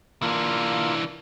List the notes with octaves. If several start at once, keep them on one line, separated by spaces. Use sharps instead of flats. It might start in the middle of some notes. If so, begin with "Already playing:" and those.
E3 A#3 D4 F4